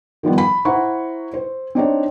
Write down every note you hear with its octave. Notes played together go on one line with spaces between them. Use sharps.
D#3 F3 G3 B3
B5
E4 C5 F#5 A#5 C#6
C5
C4 D4 D#4 C#5